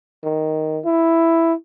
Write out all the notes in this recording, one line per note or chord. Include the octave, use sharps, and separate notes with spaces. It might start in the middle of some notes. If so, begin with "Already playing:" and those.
D#3
E4